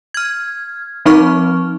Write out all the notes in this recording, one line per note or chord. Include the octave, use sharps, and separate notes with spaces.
F6 G#6
F3 C4 D#4 C#6 F6